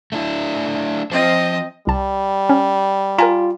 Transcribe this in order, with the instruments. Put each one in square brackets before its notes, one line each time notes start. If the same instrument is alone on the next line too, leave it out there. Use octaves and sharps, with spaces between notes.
[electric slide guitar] A3 D4 E4
[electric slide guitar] F3 C5 [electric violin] C4 D#5
[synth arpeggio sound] C2 A5 [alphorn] G3
[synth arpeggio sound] C#4
[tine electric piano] F4 [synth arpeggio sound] A#4 G#5 A#5